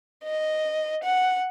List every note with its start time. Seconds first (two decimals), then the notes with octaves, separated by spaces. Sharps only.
0.24 D#5
1.03 F#5